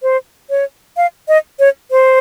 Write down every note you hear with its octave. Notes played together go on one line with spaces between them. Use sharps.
C5
C#5
F5
D#5
C#5
C5